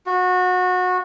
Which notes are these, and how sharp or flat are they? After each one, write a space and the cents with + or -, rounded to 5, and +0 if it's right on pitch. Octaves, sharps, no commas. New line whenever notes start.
F#4 -25